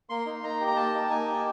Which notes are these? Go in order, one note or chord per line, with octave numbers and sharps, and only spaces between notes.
A#3 C6
D#4
A#3 A#5
G4
A#5
A#3 A5
D#4
A#3 G#5
G4